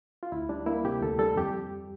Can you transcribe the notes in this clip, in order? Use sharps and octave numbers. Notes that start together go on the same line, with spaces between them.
F4
D2 E4
G3 D4
A#3 E4
C3 G4
D2 A4
G3 A4
F2 G4